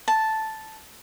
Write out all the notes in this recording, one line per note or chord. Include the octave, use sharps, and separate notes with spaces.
A5